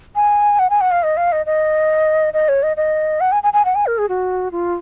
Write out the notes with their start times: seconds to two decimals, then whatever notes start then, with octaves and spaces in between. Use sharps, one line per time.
0.16 G#5
0.59 F#5
0.70 G#5
0.81 F#5
0.91 F5
1.03 D#5
1.17 F5
1.32 D#5
1.46 D#5
2.34 D#5
2.49 C#5
2.63 D#5
2.77 D#5
3.21 F#5
3.32 G#5
3.43 G#5
3.53 G#5
3.65 F#5
3.75 G#5
3.87 A#4
3.98 G#4
4.09 F#4
4.52 F4